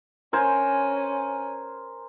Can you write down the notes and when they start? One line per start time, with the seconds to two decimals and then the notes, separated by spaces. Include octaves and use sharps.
0.33 C#4 A#4 C5 G#5